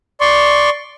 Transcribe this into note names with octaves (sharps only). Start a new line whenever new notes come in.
D5 C6 C#6